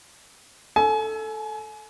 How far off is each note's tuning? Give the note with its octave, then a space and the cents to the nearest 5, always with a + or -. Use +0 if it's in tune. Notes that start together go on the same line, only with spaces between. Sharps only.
A4 +0 G#5 +30